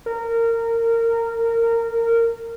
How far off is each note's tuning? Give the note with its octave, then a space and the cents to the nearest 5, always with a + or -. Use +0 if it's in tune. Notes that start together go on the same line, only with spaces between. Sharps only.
A#4 -20